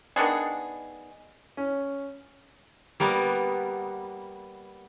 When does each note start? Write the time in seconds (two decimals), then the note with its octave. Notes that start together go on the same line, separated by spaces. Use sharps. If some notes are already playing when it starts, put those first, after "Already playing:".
0.16 D#3 B3 D4 G#4
1.57 C#4
3.00 G3 A#3 B3